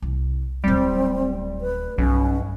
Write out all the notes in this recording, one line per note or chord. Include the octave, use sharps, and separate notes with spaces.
C2
D1 G3 A3 C4
B4
B1 G2 C#4